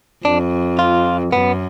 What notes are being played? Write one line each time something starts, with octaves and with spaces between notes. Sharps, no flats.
F2 D4
F4
F#2 B3